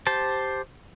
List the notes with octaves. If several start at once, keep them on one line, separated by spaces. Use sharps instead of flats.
G4 C5 A5